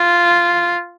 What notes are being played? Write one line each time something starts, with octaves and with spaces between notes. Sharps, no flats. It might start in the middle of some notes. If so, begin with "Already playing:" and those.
Already playing: F4